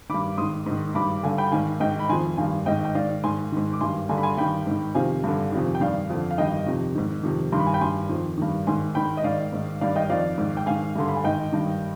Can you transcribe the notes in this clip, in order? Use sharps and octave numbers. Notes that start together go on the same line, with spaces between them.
G2 D#3 B5 D6
G#2 D#3 C6 D#6
G#2 D#3
G2 D#3 B5 D6
G2 D3 F5 G#5
G5 B5
G#2 D#3 F5 G#5
G#2 D#3 D#5 G5
B5
F2 D#3 G#5 C6
G2 D#3 F5 G#5
G#2 D#3 D#5 G5
G5
G#2 D#3 D5 F5
G#2 D#3 G#5 C6
G#2 D#3
D6
G2 D#3 G#5 C6
G2 D3 G#5 C6
B5
G#5 C6
G2 D#3 G5 B5
G#2 D#3
F2 C3 D#3 F5 G#5
G2 D3
F2 C3 D#3
G5
G2 D#3 D5 F5
F2 D3
F5
G2 D#3 D#5 G5
F2 C3 D#3
G#2 D#3
F2 C3 D#3
G2 D#3 C6
B5
G#5
G5 B5
G2 D#3 G#5 C6
F2 D#3
G2 D#3
G#2 D#3 G#5 C6
G#2 D#3 G5 B5
D#5
G#2 D#3 D5 F5
G#2 D#3
G2 D#3 D5 F5
D#5 G5
F2 D#3 D5 F5
G#2 D#3
G5
G#2 D#3 F5 G#5
G2 D3 C6
B5
G#5
G#2 D#3 D#5 G5
G2 D#3